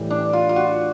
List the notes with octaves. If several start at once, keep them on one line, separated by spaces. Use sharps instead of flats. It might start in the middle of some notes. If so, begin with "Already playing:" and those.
Already playing: A2 E3 G3
D4
F4
F4
F#4